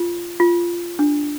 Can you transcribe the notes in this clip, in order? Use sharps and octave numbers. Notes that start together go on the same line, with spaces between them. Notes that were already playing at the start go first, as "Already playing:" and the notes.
Already playing: F4
F4
D4